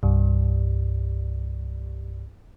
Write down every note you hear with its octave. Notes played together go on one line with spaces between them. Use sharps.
C2 G2